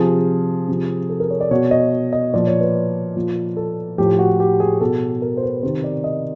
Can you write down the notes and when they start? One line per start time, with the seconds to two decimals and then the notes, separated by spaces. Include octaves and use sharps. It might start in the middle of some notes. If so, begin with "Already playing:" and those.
Already playing: C3 F3 G#4
0.68 C3 F3
1.10 A4
1.20 A#4
1.30 C#5
1.41 D5
1.51 B2 C#5
1.71 D#5
2.13 D#5
2.34 A#2 F3 D5
2.47 C#5
2.61 B4
3.16 A#2 F3
3.57 A4
3.98 A2 F3 G4
4.19 F#4
4.40 G4
4.60 G#4
4.81 B2 A4
5.22 A#4
5.37 C5
5.43 B4
5.63 C3 D#3 C5
5.84 D5
6.04 D#5